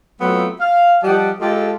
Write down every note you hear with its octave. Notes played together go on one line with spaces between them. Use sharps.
F#3 A3 B3 C4 F4
F5
F3 G3 G4 D#5 F#5 A5
G#3 F4 G4 A4